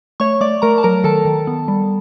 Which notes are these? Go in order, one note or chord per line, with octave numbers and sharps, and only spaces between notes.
A3 C#5 C#6
A3 D5 D6
A3 A#4 A#5
A5
F#3 A#4 A#5
D#3 A4 A5
D#3
B3
G3